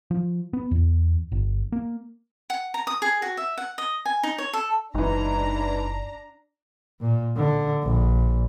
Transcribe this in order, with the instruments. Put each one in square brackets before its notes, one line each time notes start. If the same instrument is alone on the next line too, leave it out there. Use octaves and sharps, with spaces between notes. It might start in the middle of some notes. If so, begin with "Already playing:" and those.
[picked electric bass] F3
B3
E2
G1
A#3
[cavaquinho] F#5
A#5
D#6
G#4
F#4
E5
F#5
D#5
G#5
D#4
C#5
A4
[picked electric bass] F#1 [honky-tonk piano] G#2 E3 [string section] D4 A#5
[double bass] A#2
D3
A#1